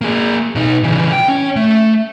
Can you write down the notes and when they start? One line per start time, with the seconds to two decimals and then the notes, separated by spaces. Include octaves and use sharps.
0.01 A#3 G#4
0.55 B2 D#4
0.84 C#3 E3
1.13 G5
1.28 C#4
1.56 A3